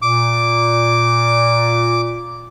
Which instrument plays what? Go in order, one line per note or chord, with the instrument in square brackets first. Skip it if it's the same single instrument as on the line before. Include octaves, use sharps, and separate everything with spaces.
[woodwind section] A#2 [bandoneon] D6